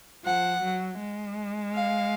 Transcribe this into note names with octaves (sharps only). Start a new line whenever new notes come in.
F3 F#5
F#3
G#3
F5